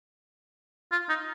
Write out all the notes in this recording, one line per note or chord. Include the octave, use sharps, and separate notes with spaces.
F4
D#4